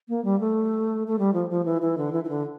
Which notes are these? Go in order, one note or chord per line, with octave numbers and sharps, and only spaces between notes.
A#3
G3
A3
A3
G3
F3
F3
E3
E3
D3
E3
E3
D3